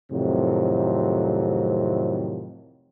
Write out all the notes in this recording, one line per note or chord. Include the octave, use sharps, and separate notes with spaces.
F2 A2 C3 D#3 F#3 C4